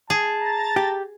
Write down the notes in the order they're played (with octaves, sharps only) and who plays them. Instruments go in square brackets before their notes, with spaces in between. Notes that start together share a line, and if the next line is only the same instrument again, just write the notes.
[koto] G#4 [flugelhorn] A5
[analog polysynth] A#5 A6
[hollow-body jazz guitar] G4